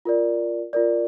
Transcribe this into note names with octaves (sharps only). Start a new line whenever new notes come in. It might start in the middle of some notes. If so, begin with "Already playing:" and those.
F4 A#4 D5
F4 A#4 D5